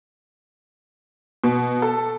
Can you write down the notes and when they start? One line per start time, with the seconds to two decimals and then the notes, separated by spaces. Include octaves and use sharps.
1.44 B2
1.82 A4